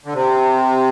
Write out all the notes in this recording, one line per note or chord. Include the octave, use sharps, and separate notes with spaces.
D3
C3